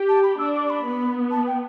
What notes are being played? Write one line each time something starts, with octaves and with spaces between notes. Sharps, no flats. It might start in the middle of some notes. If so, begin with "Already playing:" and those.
Already playing: G4
A5
B5
D4 E6
D6
D6
B5
B3
A5
G5